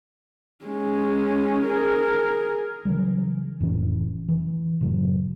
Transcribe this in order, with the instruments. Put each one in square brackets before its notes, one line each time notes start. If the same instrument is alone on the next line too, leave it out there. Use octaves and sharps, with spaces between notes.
[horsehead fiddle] G#3 C#4
G#4 A#4
[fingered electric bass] C#3 E3 F#3 G3
F1 A2 E3 C#4
E3
F#1 A2 C#3 F#3